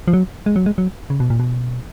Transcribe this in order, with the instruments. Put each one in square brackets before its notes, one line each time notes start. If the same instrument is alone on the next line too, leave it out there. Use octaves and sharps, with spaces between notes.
[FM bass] F3
F#3
G#3
F#3
G#3
F#3
C#3
B2
A#2
B2